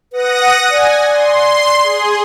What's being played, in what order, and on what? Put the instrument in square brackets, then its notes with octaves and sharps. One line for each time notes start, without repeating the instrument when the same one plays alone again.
[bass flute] B4 [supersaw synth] F#5 D#6 A#6
[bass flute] D5 [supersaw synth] G#5
[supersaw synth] C6
G#4